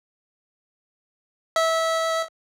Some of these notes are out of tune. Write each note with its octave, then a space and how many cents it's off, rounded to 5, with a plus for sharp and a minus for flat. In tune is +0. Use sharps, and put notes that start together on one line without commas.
E5 -20